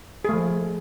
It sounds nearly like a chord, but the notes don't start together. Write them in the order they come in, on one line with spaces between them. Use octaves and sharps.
G#4 A3 F3